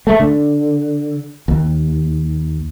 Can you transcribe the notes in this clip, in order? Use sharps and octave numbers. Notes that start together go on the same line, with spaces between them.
A3
D3
D#2